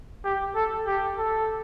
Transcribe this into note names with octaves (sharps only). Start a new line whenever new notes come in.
G4
A4
G4
A4